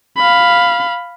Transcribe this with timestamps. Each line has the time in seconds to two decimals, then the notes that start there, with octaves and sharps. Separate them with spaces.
0.17 F5 B5